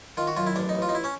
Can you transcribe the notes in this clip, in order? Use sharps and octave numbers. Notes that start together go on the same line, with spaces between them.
D#3 F4
F#4
F#2 F4
E4
A1 D4
D#4
A1
F4
D#4
E4
C#4